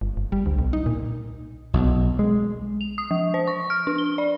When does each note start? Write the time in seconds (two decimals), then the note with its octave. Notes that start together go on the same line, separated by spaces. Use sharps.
0.01 G1
0.17 G1
0.32 G3
0.46 D2
0.59 B1
0.73 D#4
0.86 A#2
1.73 B1
2.19 G#3
2.81 F7
2.98 D#6
3.11 F3
3.34 C5
3.47 C#6
3.70 F6
3.87 D4
3.98 G7
4.18 D5